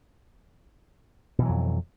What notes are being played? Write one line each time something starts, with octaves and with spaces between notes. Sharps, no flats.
F2 B2 E3 F#3